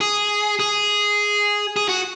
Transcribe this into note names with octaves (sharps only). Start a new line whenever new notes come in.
G#4
G#4
G#4
F#4